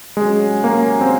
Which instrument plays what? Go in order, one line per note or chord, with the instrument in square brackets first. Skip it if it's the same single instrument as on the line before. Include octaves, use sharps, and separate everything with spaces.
[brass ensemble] C3 F#3 C#4 [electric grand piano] G#3
[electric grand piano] A#3
C4